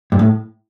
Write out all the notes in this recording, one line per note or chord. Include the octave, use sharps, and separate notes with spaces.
G2
A2